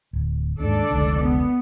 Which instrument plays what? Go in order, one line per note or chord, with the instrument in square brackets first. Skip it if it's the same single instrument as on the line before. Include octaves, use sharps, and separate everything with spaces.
[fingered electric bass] D1
[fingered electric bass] D#2 G#2 [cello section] D4 A4 D5
[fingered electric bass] F1 C#2 D3
[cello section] B3